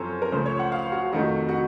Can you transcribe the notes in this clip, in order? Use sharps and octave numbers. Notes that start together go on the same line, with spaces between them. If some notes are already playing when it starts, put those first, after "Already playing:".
Already playing: F#2 F3 C4 A4 C5 C#5
A#4
C#2 C#3 F3 A3 C5
C#5
F#5
F5
F#4
F2 C3 D#3 A3 F#4
F#4